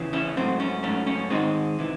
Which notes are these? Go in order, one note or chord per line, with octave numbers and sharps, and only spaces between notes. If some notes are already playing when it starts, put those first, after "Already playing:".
Already playing: E2 C#3 E3
C#4 E4
G#2 F#3 A3 C4
C#4
G#2 F#3 A3 C#4
C#4
G#2 D#3 G#3 C4 D#4
C3 E3